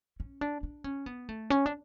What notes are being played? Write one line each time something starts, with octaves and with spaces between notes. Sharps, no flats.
C#4
D4
D4
C#4
B3
A3
C#4
D4